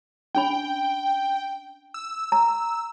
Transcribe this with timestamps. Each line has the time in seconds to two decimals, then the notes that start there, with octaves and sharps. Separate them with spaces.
0.35 C#4 D4 G5 B5
1.94 E6
2.32 A#5